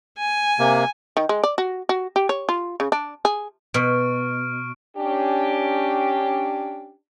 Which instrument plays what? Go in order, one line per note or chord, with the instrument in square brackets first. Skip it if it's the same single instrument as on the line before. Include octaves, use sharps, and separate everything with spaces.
[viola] G#5
[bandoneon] C3 A#3
[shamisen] D#3
G#3
D5
F#4
F#4
G4
C#5
F4
C#3
D4
G#4
[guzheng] B2 [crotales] C#6 F6 D7
[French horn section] C#4 D4 G4